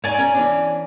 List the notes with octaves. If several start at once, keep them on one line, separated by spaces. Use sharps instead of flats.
G#2 C#5 D5 G#5
C#4 A#4
E3 C#4 D4